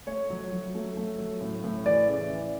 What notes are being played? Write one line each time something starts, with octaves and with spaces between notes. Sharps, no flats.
A3 C#5
F#3
F#3
A3
A3
F#3
A2
A2
E3 D5
C#3
E3